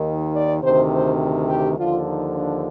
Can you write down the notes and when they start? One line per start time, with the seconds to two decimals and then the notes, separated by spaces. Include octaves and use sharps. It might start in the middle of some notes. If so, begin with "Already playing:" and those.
Already playing: D#2 D#3
0.35 D5
0.63 D2 C3 D#3 C5
0.92 C5
1.49 G4
1.77 D#2 D3 F3 F4
2.06 D#4
2.35 D4